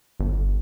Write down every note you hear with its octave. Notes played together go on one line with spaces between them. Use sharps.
G1